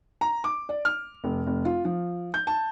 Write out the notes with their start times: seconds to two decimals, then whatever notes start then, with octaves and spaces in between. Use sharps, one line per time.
0.21 A#5
0.44 D6
0.69 D5
0.85 F6
1.24 F1
1.47 F1
1.65 F4
1.85 F3
2.34 G6
2.47 A5